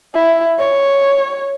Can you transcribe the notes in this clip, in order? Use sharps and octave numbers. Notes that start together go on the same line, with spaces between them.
E4
C#5